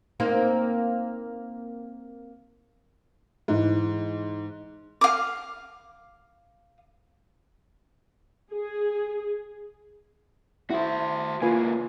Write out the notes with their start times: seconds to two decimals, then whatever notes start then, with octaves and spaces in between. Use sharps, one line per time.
0.20 A#3 C4 D#4
3.48 G#2 E3
5.01 F5 D6
8.52 G#4
10.70 E4 F#4 C5
11.42 C#2 A#3 F4 B4 G#5